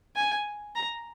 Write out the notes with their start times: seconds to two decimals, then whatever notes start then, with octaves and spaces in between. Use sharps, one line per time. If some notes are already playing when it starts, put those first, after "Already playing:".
0.16 G#5
0.76 A#5